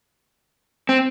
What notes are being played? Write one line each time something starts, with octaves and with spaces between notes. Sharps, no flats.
C4